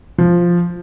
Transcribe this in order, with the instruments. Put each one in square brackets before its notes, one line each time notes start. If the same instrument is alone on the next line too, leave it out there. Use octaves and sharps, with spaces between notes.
[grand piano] F3